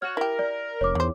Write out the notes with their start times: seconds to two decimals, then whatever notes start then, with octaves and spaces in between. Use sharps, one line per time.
0.02 F#4 C#5 F6
0.17 E4 G4 A#4
0.39 D5
0.81 F1 C#5 D6
0.95 E2 D#3 C5